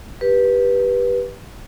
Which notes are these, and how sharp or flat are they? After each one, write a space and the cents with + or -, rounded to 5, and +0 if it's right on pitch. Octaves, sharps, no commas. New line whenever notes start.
G4 +0 B4 -15